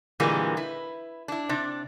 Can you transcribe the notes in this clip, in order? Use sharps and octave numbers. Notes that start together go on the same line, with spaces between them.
A#2 D3 E3 G3 G#3 A#3
E4 B4
D4 E4
C3 D4